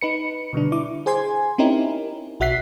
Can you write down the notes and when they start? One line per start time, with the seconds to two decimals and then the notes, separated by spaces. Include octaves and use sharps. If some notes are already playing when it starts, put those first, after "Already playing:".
0.01 D#4 B4 C#7
0.53 B2 D3 G3 D4
0.72 E4 D6
1.06 G#4 C5 G#5 C6 G#6
1.58 C4 C#4 D#4 E4 G4 A#4
2.40 B1 F#4 E5 F#6 B6 C7